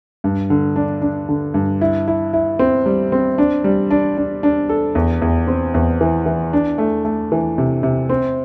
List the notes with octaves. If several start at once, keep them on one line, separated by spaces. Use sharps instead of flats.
G2
D3
D4
D4
D3
G2
E4
E4
E4
C4
G3
C4
D4
G3
D4
D4
D4
A4
E2
E2
C4
E2
E3
E3
D4
A3
A3
E3
C3
C3
C4